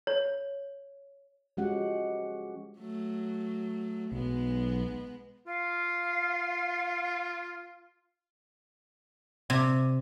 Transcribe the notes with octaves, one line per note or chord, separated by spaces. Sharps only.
C#5
F3 G#3 C#4 F#4 G4 F#5
F#3 A3
B1 G#3 B3
F4 F5
C3